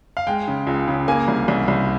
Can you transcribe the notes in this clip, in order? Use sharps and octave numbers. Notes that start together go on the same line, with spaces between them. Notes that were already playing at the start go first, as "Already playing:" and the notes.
F5
G#3 G5
C#3
C#2
C#3
A#3 G#5
C2
C2
C2